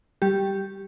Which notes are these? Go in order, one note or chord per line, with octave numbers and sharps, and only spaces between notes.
G3 G4